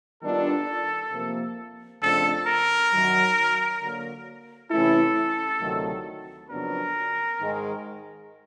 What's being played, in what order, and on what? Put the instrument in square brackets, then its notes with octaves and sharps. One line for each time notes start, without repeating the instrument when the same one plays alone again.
[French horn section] D#3 G3 B3 D4 F4 [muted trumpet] A4
[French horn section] C3 F3 A#3
[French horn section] F2 C#3 F3 A3 D4 [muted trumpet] A4
[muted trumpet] A#4
[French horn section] F#2 D#3 F#3
D3 F#3 A#3
[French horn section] C3 E3 A3 C#4 E4 [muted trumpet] A4
[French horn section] D2 C3 D#3 F#3 A3
[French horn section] F2 C#3 F#3 B3 D4 [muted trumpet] A#4
[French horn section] G#2 D#3 G#3